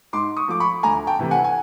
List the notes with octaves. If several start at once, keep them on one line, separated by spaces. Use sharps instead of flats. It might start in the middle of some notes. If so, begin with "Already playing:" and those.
G#2 C6 D6
C#6 D#6
F3 A3 D6
B5 C#6
D2 G#5 A#5
G5 A5
C3 E3 A3
F#5 G#5
G#5